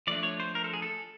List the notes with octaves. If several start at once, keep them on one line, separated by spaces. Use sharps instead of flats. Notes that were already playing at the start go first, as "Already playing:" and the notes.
F3 A3 D4 D5
C#5
C5
A#4
A4
G#4
A4